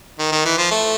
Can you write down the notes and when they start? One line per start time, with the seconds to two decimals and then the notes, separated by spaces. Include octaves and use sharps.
0.19 D#3
0.32 D#3
0.45 E3
0.57 F3
0.71 A3